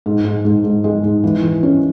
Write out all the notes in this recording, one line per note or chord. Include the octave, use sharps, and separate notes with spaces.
G#2
G#2
G#2
G#2
G#3
G#2
E3
E3
C#4